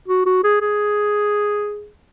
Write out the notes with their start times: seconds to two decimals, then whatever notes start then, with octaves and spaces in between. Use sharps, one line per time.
0.08 F#4
0.26 F#4
0.44 G#4
0.61 G#4